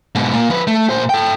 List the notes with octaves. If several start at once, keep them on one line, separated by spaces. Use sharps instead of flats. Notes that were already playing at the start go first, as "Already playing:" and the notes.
G#2 B2
A#2 A#3
F3 B4
A3
A#2 C5
A4 G5